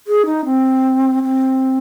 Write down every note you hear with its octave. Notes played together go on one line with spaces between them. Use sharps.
G#4
D#4
C4
C4